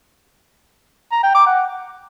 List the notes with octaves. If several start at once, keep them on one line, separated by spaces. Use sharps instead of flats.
A#5
G5
D6
F#5